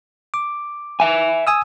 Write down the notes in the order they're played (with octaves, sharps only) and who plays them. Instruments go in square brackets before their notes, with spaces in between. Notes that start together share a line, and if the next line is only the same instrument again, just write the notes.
[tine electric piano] D6
[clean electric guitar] E5 G#5
[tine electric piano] G#5 D#6 E6